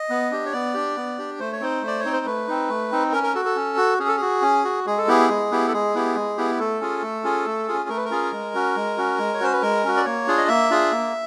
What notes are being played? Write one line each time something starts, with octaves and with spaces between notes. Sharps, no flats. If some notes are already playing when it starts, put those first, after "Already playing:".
Already playing: D#5
B3
D4 G4
C#5
B3 D5
D4 G4
B3
D4 G4
A3 C5
C#5
C4 D#4 C5
A3 D5
C#5
C4 D#4
C5
A3 B4
C4 D#4
A3
C4 D#4
C#4 A#4
A#4
F#4 A4
A4
C#4
F#4
C#4 G#4
A4
F#4 G#4
C#4
F#4
G#3 G#4
A4
B3 E4 G4 G#4
G#3
B3 E4 G4
A4
G#3 G#4
B3 E4 G4
G#3
B3 E4 G4
A3 A4
C#4 F4 G#4
A3
C#4 F4 G#4
A3
C#4 F4 G#4
A3 A#4
B4
A#4
C#4 F4 G#4
G#3
C#4 F#4
G#3
C#4 F#4
G#3
C#5
C#4 F#4 C5
B4
G#3 A#4
C#4 F#4
D5
A#3 C#5
D4 F4 G#4
D#5
A#3 E5
D4 F4 G#4
A#3